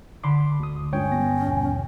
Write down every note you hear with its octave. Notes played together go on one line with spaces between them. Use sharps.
D3 B5 C6 D6
D2 D#6
G2 G#3 C#4 F4 C#5 G5
G3 B3 A#6
D#2 B2 E3